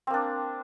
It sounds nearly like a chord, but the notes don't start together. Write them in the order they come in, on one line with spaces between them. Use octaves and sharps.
C4 A#3 D4